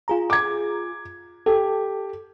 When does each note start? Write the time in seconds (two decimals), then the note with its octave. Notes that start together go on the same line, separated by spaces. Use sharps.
0.08 F4 G#4 A#5
0.30 D6 G#6
1.46 G4 A4